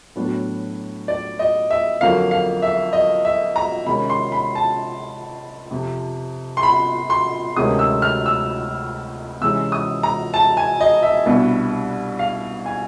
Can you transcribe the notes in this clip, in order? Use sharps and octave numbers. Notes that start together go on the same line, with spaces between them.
A2 F#3 B3 D4
D5
D#5
E5
F2 D3 F#3 A#3 F5
F5
E5
D#5
E5
A#5
C3 D#3 G#3 C#4 B5
C6
B5
A5
F2 C3 F3
C6
B5
C6
D2 C3 D#3 G#3 C#4 D#6
E6
F6
E6
C3 E3 G#3 C#4 E6
D#6
A#5
A5
G#5
D#5
E5
C2 B2 G3 B3 D4
F5
G#5